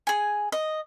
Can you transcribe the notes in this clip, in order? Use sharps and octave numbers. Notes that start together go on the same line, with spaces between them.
G#4 G#5
D#5